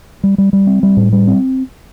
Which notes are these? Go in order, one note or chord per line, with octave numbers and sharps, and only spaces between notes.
G3
G3
G3
C4
G3
A2
G3
C4